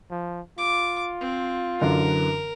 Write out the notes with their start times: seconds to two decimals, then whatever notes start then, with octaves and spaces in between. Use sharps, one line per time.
0.11 F3
0.58 F4 D6
1.21 C4
1.81 F#2 D3 E3 A#4